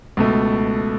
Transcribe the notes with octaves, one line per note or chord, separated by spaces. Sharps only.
C#2 B2 A3